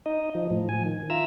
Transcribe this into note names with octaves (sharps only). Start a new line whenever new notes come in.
D#4 D#5
F3
A2 F3
G#5
D#3
F4 E5 A#5 E6